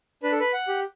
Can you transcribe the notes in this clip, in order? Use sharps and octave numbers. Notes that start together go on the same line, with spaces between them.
D4 B4
A4
B4
F#5
G4